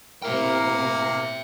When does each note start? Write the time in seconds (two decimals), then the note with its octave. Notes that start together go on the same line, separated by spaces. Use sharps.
0.22 A2 C3 A#3 E4 A#4 E5 G5